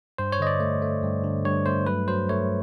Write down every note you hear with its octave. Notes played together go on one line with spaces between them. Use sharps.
G2 C5
C#5
D3 D#5
D5
A3
A3
G2
D3
G2 C#5
A3 C5
F#3 B4
F#3 C5
A3 C#5